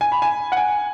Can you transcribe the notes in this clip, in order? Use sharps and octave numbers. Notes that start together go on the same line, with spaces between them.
G#5
B5
G#5
F#5
G#5